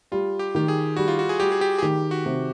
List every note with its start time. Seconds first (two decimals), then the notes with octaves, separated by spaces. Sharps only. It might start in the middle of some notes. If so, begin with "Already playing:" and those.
0.12 G3 F4
0.39 G4
0.55 D#3 G4
0.68 G#4
0.96 G3 F#4
1.08 F4
1.19 F#4
1.29 G#4
1.40 G3 G4
1.52 G#4
1.61 G4
1.78 G#4
1.82 D#3 G4
2.11 F#4
2.26 C3